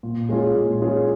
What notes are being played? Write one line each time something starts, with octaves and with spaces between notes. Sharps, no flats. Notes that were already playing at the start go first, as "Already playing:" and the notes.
A#2
G#3 C#4 F4 G#4
A#2
G#3 C#4 F4 G#4